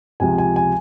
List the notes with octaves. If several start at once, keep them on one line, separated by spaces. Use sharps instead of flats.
C#2 C3 F3 G#5
G#5
G#5